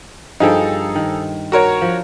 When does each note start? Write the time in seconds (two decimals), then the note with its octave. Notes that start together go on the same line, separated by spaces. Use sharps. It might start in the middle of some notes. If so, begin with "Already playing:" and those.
0.40 G2 F3 D#4 G#4 A4 G5
0.95 D#3
1.52 F#4 A#4 C#5
1.82 F3